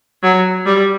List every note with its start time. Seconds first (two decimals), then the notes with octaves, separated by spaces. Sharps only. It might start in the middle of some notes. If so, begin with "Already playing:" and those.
0.23 F#3
0.66 G3